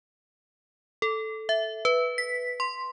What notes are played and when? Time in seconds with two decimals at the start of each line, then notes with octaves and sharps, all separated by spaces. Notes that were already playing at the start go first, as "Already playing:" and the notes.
1.02 A4
1.49 E5
1.85 B4
2.18 B6
2.60 C6